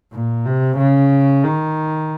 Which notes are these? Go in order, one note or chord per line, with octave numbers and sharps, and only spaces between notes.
A#2
C3
C#3
D#3